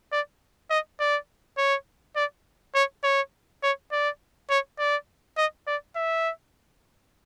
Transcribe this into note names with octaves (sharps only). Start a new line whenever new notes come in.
D5
D#5
D5
C#5
D5
C#5
C#5
C#5
D5
C#5
D5
D#5
D5
E5